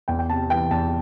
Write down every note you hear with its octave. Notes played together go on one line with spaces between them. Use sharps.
E2 G5
G5
C3 A5
E3 G5
E2 A5